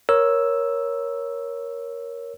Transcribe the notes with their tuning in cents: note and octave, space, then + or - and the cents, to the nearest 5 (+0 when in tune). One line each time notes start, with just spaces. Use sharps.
A#4 +15 C#5 +0 E6 +0